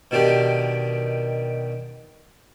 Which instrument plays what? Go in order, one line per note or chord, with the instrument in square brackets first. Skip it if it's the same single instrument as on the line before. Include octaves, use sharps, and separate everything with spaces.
[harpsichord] B2 D#3 D4 G4